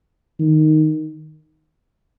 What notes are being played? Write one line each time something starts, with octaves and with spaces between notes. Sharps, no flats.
D#3